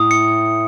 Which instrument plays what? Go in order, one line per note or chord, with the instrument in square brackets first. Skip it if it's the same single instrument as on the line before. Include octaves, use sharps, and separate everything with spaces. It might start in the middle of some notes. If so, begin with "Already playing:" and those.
Already playing: [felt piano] A2 [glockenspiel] D#6
[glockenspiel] C#7